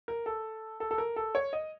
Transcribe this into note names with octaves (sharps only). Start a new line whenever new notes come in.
A#4
A4
A4
A4
A#4
A4
C#5
D#5